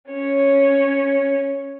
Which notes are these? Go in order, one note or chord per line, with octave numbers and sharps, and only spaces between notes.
C#4 C#5